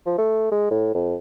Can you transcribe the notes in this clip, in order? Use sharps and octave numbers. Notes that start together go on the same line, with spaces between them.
F3
A3
G#3
A2
F2